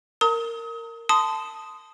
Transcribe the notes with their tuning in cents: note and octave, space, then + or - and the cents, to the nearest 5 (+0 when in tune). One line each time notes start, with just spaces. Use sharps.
A#4 -15 A#5 -40 D#6 +35
A5 +0 C6 -25 D#6 +0